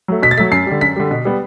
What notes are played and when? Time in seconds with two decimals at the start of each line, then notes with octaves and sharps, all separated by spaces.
0.08 F#3 A3
0.22 B2 B6
0.31 A6
0.37 F#3 A3 B6
0.52 F#2 C7
0.66 G3
0.72 D3
0.81 F#2 B6
0.96 D3 G3
1.11 B2
1.25 G3 B3